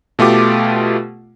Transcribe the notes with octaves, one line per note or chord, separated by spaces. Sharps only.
B2 A3 F4 G4 D6